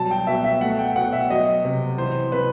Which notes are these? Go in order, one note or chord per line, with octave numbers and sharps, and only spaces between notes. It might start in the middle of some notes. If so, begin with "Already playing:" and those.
Already playing: B2 F#3 G3 A5
G5
B2 E5
E5
A3 F#5
G5
B2 F#5
E5
F#3 D#5
C3
E3 C5
C3 B4